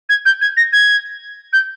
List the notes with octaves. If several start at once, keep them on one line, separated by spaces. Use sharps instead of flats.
G#6
G6
G#6
A#6
G#6
G6